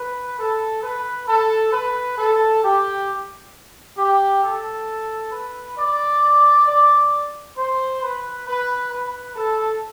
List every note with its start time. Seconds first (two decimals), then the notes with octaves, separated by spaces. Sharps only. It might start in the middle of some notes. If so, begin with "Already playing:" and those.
Already playing: B4
0.38 A4
0.82 B4
1.28 A4
1.72 B4
2.18 A4
2.63 G4
3.97 G4
4.42 A4
5.32 B4
5.77 D5
6.66 D5
7.57 C5
8.02 B4
8.47 B4
8.92 B4
9.36 A4